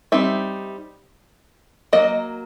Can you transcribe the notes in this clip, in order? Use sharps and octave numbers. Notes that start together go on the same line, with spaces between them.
G3 C4 D#4 E5
F#3 A#3 D#5